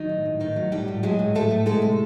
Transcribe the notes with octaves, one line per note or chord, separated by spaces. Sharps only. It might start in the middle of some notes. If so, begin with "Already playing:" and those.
Already playing: D#3 F#3 D#4
A2
A2
A2 D#3 D#4
F#3
A2 G3 G4
A2
F#3 G#3 G#4
A2
A2 A3 A4
A2
G#3 A3 A4
C3